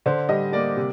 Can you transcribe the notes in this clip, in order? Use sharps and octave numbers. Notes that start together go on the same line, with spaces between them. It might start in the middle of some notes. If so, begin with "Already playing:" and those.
D3 C5
G3 D#5
A#3 D5
C3